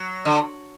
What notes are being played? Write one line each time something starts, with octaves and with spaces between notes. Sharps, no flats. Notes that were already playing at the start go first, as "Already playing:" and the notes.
Already playing: F#3
D3